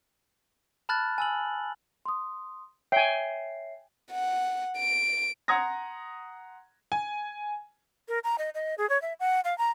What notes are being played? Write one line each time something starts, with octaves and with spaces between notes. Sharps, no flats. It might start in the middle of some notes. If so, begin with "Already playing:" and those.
A5 B5 F6 F#6 A6
G#5 E6 F#7
C6 D#6
C#5 E5 G5 G#5 C7
F#5
D7
F#5 A#5 C6 D#6 G#6 A#6
G#5
A#4
A#5
D#5
D#5
G#4
C#5
E5
F#5
F5
A#5